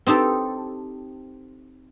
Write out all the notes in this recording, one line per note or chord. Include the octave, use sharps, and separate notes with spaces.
C4 D#4 G4 A4